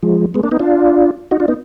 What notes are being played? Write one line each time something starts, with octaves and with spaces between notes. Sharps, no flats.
F3 G#3
G#3 B3
A#3 D4
B3 D#4
D4 F4
D#4 F#4
D4 F4
B3 D#4